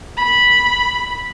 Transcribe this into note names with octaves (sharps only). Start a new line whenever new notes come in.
B5